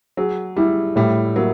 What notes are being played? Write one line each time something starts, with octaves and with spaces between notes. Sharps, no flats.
F#3 G#4
G3 E4
A2 G3
F#3 A#3